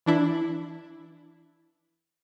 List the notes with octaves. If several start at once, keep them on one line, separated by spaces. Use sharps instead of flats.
E3 D4 E4